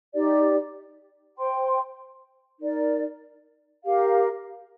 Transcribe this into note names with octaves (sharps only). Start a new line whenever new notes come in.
D#4 G4 D5
C5 G5 C6
D#4 A#4 D5
G4 A#4 F5